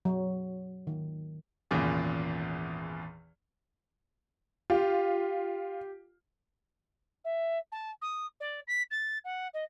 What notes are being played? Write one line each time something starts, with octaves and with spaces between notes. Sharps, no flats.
F#3
D#3
G#1 E2 A#2 C#3 G#4
F4 G4
E5
A5
D#6
D5
B6
A6
F#5
D#5